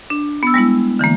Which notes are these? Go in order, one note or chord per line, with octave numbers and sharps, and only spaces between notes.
D4
B3 E6
G3 G#3 B3 E4
D3 E3 G#3 A#3